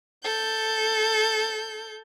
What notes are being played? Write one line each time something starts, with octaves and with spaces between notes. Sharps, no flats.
A4 G6